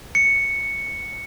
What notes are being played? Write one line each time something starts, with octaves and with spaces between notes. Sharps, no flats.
C#7